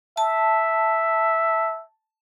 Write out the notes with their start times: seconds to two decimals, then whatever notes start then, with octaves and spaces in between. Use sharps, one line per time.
0.17 E5 A5